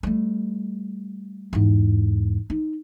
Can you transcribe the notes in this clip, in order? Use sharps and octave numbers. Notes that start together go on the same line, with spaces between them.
G3 A3
E2 G#2
D#4